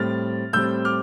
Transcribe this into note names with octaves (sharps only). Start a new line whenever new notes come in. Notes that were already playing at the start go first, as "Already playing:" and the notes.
Already playing: A2 G3 C4 F6 A6
A2 G3 C4 E6 G6
D6 F6